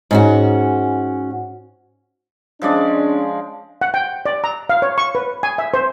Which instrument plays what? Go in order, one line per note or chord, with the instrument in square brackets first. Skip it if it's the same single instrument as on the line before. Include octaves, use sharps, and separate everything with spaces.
[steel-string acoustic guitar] G#2 C#4 F#4
[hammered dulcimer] F3 G#3 D5 [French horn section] C#4 D4
[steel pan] F#5
G5
D5
A#5
F5
C#5
C#6
B4
G#5
E5
C5